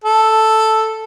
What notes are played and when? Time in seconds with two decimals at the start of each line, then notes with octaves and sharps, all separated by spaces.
0.04 A4